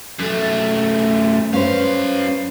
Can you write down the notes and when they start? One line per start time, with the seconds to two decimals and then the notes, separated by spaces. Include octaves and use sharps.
0.20 F#2 A3
1.54 F#2 C#4 B4 C5 F5